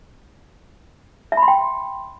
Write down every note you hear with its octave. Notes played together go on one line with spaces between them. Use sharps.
E5
B5
C6
G5